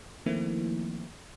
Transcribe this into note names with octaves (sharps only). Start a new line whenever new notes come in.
D#3 F3 A3 A#3 C4 E4